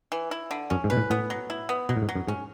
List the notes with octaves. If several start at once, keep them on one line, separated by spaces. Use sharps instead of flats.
E3
E4
D3
F#2 C#4
G#2
B2 B4
A2
A2 B3
F#3
E4
B3
B2 F#3
A2
G#2
F#3
F#2
G#2 C#4